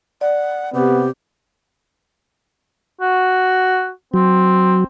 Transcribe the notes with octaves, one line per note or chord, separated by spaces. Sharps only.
D5 F#5
C3 B3 G4
F#4
F#3 C4